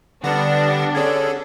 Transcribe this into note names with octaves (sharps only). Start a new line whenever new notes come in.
D3 G3 B3 D4 F#5 A#6
D3 C#4 G#4 A4 C#5 G#6